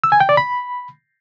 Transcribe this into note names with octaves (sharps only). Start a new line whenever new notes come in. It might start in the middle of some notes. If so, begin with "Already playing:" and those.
E6
G#5
G5
D5
B5